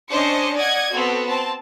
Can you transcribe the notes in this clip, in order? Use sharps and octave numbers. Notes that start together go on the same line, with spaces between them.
C#4 D4 C5 D#5 C#7
D5 D#5 F#5 G#6
B3 C4 F#4 A4
C4 A5